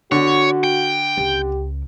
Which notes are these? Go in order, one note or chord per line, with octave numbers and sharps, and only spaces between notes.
D3 F#4 C#5
G5
C#2 G4